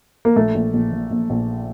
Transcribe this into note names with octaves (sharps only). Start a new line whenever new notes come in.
A#3
A#1 A3
A#1
A#1
A#2
A#1
A#1